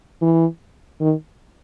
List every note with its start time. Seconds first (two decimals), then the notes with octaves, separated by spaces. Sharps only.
0.22 E3
1.01 D#3